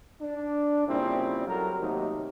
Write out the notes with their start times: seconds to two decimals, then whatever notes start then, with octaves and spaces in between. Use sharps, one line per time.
0.20 D4
0.87 A#2 C#3 G3 C4 E4
1.47 F#3 G3 A4 A#4
1.78 D#2 C3 F#3 A3 D#4